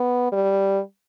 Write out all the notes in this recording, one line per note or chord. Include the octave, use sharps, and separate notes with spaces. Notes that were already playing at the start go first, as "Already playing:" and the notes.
Already playing: B3
G3